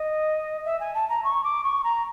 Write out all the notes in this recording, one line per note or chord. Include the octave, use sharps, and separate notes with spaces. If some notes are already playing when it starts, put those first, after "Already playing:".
Already playing: D#5
E5
G#5
A5
A#5
C#6
D6
C#6
A#5